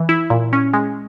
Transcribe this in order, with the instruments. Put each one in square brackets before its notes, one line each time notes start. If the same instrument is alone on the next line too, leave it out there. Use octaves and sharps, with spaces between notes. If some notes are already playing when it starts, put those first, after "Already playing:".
Already playing: [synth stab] E3
E4
A#2
C#4
G#3